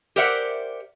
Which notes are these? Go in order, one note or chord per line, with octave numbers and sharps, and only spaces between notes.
G4 A#4 C5 D5 E5 F#5